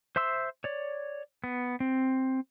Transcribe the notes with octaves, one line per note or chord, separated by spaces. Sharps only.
C5 E5 C6 E6
C#5 D5
B3
C4